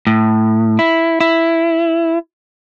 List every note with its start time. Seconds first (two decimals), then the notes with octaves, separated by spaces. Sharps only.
0.07 A2
0.79 E4
1.21 E4